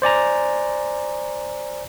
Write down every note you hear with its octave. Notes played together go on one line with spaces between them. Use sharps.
C5 D5 G#5 A#5